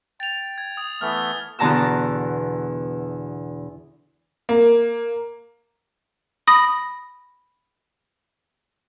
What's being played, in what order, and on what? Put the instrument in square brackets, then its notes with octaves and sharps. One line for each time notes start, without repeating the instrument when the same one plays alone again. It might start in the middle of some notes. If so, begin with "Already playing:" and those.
[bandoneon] G5 [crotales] A6 F7
[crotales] G#6
D#6
[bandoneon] E3 A3 B3 [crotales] F6
[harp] E2 B2 D3 A5 A#5 E6
[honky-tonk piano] A#3
[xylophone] B5 D#6 A#6